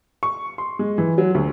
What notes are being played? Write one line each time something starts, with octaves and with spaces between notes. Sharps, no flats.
C#6
C6
G#3
E3
F#3
D2